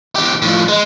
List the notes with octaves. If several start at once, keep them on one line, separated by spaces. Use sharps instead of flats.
E2 G4
A2 F3
G#3